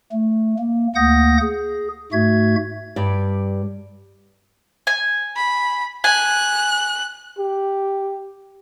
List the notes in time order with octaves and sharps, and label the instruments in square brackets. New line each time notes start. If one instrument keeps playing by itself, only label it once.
[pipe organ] A3
A#3
D2 A#3 F#5 D#6 G6 A#6
G#4
G#2 A3 F#4 E5 G#6
[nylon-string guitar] G2 G3 D5
[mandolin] G#5
[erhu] B5
[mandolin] G#5 [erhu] F#6
[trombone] G4